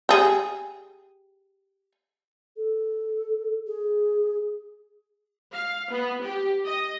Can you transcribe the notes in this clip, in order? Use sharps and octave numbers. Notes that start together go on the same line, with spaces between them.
G4 G#4
A4
G#4
F5
B3
G4
D#5